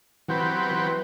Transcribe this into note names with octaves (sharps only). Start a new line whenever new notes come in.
E3 F#3 C4 G4 B4
E3